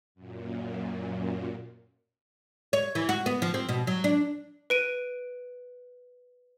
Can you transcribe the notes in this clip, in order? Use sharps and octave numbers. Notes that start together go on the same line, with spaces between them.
F#2 A#2
C#5
E3
F#4
B3
F3
C4
B2
F#3
D4
B4 D7 D#7